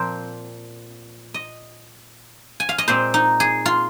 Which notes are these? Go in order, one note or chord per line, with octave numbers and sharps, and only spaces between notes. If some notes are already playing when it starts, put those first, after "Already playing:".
Already playing: A#2 F3 C4 A#4 C5
D#5
G#5
F5
D#5
A#2 G#3 C4 C5
D#4
G#4
F4